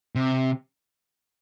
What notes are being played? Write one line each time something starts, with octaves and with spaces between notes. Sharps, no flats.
C3